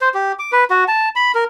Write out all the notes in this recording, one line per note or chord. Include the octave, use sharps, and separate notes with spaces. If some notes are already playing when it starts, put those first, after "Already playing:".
C5
G4
D6
B4
F#4
A5
B5
A#4